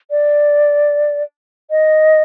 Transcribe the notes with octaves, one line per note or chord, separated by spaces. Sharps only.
D5
D#5